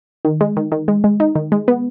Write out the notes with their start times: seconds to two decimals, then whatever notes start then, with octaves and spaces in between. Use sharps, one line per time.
0.25 D#3
0.41 G#3
0.57 D#3
0.72 D#3
0.88 G#3
1.04 G#3
1.20 D#4
1.35 D#3
1.52 G#3
1.68 B3